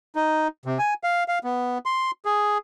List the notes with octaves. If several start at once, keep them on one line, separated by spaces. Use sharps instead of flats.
D#4
C3
G#5
F5
F5
B3
C6
G#4